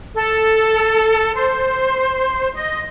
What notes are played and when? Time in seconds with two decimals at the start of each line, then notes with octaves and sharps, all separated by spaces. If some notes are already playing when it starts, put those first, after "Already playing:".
0.15 A4
1.33 C5
2.53 D#5